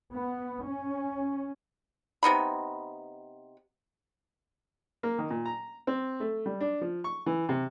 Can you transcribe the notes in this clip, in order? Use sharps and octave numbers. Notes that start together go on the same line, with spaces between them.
B3
C#4
C3 B3 D#4 B5
A#3
D#3
A#2
A#5
C4
A3
G3
D4
F3
C#6
E3
C3